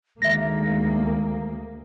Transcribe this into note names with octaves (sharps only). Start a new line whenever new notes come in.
D2 D#3 G#3 A#3 E5 A#6